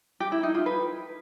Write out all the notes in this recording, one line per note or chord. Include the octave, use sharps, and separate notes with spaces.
G4
E4
D#4
F4
B4